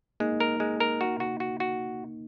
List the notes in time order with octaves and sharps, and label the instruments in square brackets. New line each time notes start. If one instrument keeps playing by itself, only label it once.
[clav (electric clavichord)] G#3 [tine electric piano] A#3 D#4
[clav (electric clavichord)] A#4
G#3
A#4
F#4
F#4
F#4
F#4